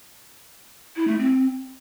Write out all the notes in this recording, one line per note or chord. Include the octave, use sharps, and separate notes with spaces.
E4
A3
C4